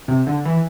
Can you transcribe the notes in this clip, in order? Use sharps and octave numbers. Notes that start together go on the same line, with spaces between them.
C3
D3
E3